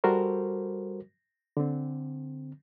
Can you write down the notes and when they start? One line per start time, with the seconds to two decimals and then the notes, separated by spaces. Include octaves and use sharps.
0.04 G3 F#4 A4 A#4 C5
1.57 D3 C4